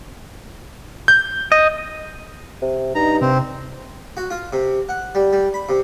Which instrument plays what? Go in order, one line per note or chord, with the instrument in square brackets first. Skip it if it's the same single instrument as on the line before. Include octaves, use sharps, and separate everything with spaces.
[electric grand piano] G6
[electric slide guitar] D#5
[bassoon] C3
[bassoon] G2 [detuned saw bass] D#4 [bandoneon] A#5
[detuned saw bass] C3 [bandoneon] C4
[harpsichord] F#4
F4
C3
F#5
G3
G3
B5
C3